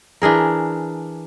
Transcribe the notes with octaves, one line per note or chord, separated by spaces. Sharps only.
E3 D4 G#4 A#4